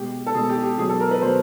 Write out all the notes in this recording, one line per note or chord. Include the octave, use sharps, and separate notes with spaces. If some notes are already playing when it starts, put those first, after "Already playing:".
Already playing: B2 G#3 G4
A4
B2 G#3 G#4
G4
G4
B2 F#3 G#4
A4
A#4
B4
B2 F#3 C5